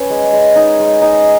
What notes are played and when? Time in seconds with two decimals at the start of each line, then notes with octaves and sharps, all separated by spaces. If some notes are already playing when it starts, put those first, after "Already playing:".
Already playing: C#4 B4 C#5
0.10 G#3
0.33 G#3
0.56 D#4
0.80 G#3
1.02 D#4